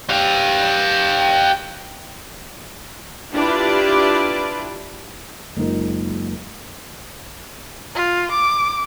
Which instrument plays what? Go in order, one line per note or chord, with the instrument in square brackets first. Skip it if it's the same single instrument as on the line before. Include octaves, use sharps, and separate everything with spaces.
[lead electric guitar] G4 F5
[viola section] D4 E4 F4 G4 B4 D5
[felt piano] F#1 G#3 D#4 F4 A#4
[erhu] F4
D6